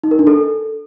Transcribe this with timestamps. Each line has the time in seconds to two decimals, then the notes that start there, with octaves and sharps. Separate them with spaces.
0.03 D#4
0.11 A#4
0.19 D4
0.27 A4